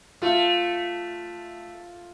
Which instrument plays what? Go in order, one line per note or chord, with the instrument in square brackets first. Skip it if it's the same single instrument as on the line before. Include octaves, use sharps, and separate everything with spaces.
[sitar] A3 [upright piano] F4